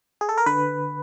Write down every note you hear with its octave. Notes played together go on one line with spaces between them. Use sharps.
G#4
A4
A#4
D3 B4